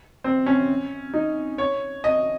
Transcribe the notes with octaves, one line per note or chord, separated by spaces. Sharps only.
C4
C#4
D#4
C#5
D#5